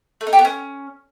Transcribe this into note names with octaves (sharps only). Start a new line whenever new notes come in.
A3
D#4
G4
B3
C#4